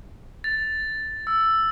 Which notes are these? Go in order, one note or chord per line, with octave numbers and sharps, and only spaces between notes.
A6
E6